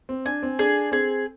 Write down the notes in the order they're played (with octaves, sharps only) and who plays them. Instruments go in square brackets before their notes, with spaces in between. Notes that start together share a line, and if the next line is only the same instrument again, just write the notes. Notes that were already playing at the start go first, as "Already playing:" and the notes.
[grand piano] C4
[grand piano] D4 [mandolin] G#5
[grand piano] C4
[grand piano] D4 [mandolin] G#4
[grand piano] C4 [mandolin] G#4